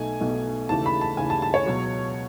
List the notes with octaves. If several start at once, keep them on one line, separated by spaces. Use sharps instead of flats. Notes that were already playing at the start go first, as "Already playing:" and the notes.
Already playing: B1 B2 A3 D#4 G#5
B1 B2 A3 D#4
D#2 C#3 E3 A3 A5
B5
A5
D#2 C#3 E3 A3 G#5
A5
A5
C#5
C#2 B2 F#3